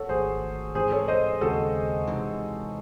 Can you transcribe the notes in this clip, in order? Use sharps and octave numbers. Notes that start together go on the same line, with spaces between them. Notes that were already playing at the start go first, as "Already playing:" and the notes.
Already playing: F#4 A4 C#5
G#1 G#2 D#3 A3 G#4 C5
G#2 E3 C4 G#4 C5
A4 C#5
C5 D#5
D#2 C#3 G#3 C4 F#4 A4
C3 E3 G#3 D#4